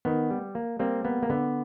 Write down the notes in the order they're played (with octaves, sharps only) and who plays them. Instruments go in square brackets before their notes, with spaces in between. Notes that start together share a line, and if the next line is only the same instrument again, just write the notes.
[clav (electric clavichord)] D#3 B3
G3
A#3
G3 A#3 C4
A#3 B3
A#3
D3 B3